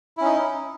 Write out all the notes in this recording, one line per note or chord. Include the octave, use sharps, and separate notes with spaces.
C#4 D#4 E4